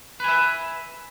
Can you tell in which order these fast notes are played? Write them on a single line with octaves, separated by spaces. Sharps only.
B4 G#5 E5